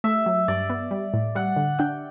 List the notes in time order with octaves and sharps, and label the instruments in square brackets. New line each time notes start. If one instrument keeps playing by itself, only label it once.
[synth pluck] A3 [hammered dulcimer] E5
[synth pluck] F#3
[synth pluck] G2 [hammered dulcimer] D5
[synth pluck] B3
G3
A2
[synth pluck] G3 [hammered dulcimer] F#5
[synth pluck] D3
[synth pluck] D4 [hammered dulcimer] G5